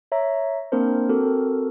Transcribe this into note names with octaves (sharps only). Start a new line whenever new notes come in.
C#5 E5 A#5
A#3 C4 D4 A#4 C5
C4 F#4 A4 A#4